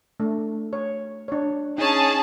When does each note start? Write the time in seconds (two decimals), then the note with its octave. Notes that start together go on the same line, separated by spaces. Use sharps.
0.20 A3 D4
0.73 C#5
1.28 D4 C#5
1.78 C#4 D#4 G#4 A5